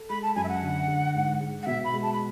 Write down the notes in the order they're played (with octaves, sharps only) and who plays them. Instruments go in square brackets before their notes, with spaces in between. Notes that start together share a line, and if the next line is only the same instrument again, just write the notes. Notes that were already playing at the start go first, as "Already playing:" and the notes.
Already playing: [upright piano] A4
[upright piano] G#3 [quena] B5
[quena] A5
[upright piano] F#2 [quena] G#5
[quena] E5
F#5
[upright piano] D3
D3
G#2
G#3
[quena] F#5
[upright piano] B2 [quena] E5
[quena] B5
[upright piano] G#3
[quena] A5
B5